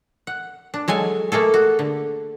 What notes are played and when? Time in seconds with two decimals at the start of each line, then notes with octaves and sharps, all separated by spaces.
0.27 F#5
0.74 D4
0.88 F#3 G#3 A4 G#5
1.32 A3 A#3 G#4 A4
1.54 F#4
1.79 D3